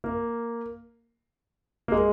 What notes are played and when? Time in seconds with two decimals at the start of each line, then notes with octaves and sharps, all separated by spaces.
0.04 A#3
1.88 A#3
1.92 G#3